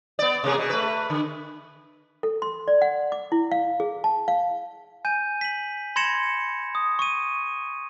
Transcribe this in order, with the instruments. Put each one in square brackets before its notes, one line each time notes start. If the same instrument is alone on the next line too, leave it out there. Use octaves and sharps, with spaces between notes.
[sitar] B3 D5
C3 A#3 G#4
B2
A3 B4
D3
[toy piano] A4
C6
D5
F#5
D6
E4
F5
G#4
A5
F5
[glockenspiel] G#5 G6 D#7
B6 F#7
B5 C6 G#6 A#6 C#7 E7
D#6
C#6 D#7